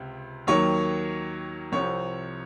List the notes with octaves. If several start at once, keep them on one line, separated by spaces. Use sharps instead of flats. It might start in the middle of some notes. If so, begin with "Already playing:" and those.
Already playing: C#2 C3
D#2 D#3 F#3 A#3 C#5
C2 C3 F3 C4 C#5